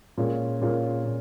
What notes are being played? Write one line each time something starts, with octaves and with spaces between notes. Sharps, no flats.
A#2 G#3 C#4 F4 A#4
A#2 G#3 C#4 F4 A#4
A#2